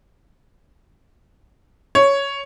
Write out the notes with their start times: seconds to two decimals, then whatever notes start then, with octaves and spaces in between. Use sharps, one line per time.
1.95 C#5